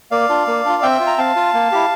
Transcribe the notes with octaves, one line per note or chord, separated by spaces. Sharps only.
A#3 D5 F5
D4 F4
A#3
D4 F4
C4 E5 G5
F4
A#5
C4 F5 A5
F4
A#3
E4 G4